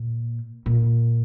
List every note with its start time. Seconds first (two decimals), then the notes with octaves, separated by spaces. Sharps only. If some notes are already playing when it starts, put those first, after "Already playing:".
Already playing: A#2
0.66 A#2